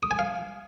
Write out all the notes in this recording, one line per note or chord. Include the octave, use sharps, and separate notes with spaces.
D#6
G#5
F5